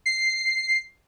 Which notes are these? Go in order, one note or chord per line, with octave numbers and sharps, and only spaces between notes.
C7